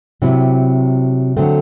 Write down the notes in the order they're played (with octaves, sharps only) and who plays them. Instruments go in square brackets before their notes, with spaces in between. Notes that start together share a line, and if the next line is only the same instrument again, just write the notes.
[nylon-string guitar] C3 F#3 C4 E4
D3 F#3 A3 C4